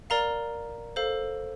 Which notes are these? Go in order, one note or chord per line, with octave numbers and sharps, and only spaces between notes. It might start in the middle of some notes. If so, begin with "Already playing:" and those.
A#4 D5 F5 A#5
A4 C5 F5